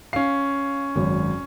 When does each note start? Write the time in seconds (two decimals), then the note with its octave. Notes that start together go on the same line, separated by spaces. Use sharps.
0.13 C#4 F5 C7
0.96 G#1 F#2